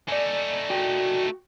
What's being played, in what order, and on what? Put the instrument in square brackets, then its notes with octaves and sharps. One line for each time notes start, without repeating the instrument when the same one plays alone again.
[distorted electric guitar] A3 D#4 [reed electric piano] D5 G#5
[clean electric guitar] F#4 G5